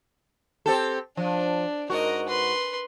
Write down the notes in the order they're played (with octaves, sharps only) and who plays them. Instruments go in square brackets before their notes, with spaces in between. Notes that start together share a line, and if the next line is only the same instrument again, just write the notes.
[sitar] C4 G4 A4
[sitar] F3 [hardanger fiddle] D4
[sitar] G#2 F#4 [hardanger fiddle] A#4 D#5
[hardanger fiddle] B4 C6